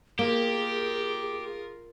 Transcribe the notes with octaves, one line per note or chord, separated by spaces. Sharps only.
A#3 F4 G4 G#4 A#4